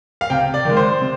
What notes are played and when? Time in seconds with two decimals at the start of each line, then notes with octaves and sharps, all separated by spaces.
0.21 F5
0.30 C3 G5
0.54 D5
0.65 D#3 G#3
0.76 C5
1.01 C3